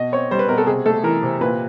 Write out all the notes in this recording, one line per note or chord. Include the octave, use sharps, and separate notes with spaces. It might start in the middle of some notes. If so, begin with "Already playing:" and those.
Already playing: B2 D#5
C4 C#5
G3 C5
B4
B2 A#4
A4
C3 G#4
A3 A4
E3 A#4
C3
A#2 B4